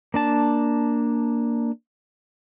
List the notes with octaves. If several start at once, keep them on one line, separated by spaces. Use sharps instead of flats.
A#3 D4 A5